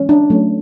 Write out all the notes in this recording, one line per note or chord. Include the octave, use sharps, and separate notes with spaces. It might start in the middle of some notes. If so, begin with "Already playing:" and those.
Already playing: E3 G#3 C#4
D4
F#3 A3 C#4